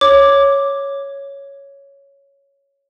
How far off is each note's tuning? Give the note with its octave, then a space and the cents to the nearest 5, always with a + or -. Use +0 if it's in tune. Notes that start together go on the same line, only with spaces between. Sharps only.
C#5 +0 D6 +0